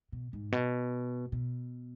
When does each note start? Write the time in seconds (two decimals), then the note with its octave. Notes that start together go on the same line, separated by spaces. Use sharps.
0.12 B2
0.33 G#2
0.52 B2
1.32 B2